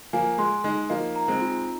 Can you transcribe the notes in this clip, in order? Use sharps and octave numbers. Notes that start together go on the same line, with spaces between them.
F3 A#3 G#5
G#3 C6
G#3 D#4
F3 A#3 D#5
A#5
G#3 C4
F4